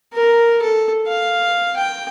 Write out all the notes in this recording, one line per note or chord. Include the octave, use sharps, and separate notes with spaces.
A#4
A4
F5
G5